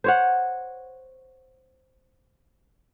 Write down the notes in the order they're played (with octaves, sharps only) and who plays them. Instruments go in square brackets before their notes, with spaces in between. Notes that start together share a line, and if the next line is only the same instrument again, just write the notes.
[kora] C5 C#5 F#5